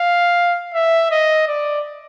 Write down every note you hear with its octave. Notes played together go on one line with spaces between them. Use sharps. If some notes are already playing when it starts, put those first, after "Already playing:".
Already playing: F5
E5
D#5
D5